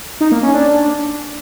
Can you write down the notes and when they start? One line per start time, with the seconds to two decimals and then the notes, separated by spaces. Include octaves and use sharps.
0.21 D#4
0.32 A#3
0.43 C#4
0.54 D4